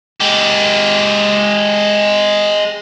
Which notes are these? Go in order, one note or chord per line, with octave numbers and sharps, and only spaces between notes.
G#3 G4